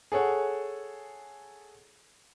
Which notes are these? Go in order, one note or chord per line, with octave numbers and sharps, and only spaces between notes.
G#4 A4 C#5 F#5